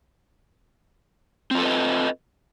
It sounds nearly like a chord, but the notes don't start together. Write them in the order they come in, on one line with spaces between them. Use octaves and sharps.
C4 F4 A4 B4 D#5